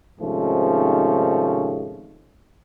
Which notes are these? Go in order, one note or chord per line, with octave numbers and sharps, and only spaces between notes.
G#2 C3 D#3 F3 A3 C#4